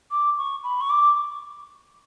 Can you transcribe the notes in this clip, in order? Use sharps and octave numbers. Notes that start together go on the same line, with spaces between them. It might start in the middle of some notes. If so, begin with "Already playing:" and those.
D6
C#6
B5
C#6
D6